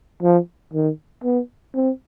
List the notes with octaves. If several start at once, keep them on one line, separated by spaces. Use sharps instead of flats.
F3
D#3
B3
C4